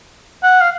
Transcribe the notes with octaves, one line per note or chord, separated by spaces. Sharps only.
F#5
F5